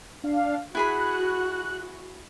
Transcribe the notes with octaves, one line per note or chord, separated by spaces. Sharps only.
D4 F5
E4 F#4 G#4 B5 F#6